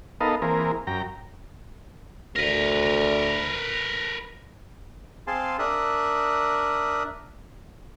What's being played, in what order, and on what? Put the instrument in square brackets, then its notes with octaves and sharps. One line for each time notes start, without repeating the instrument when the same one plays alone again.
[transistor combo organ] B3 D#4 A4 A#4 D#5 F5
E3 A#3 C4 G#4 A#4
F#2 G5 A#5
[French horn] D2 [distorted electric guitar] A#4 B4
[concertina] C4 G#4 F5 G#5 A5 C6
D4 A#4 E5 D#6 F#6